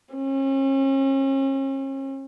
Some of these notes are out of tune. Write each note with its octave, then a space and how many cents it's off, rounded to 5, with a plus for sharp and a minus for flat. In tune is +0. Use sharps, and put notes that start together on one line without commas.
C#4 -40